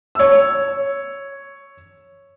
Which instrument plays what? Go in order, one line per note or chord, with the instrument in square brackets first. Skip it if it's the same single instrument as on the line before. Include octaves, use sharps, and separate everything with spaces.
[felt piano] C#5 E6